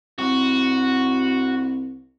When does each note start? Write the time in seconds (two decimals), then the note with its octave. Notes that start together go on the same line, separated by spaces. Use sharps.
0.19 C2 F#4